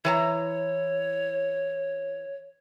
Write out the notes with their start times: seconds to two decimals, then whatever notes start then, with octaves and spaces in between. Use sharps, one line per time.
0.05 E3 C#5 G#5 A#5